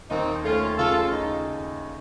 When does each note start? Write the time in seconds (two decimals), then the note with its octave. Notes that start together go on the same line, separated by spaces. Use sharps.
0.10 D#2 C4 D#4
0.44 A3 C#4 F4
0.77 C#3 F4 A4
1.12 D#4